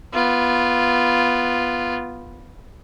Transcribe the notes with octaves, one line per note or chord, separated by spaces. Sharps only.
B3 F4